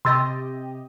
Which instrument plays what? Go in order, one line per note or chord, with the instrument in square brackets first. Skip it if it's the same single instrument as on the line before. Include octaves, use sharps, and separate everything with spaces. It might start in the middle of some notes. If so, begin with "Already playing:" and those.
[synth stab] C3 G4 D#5 [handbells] C6 E6 A6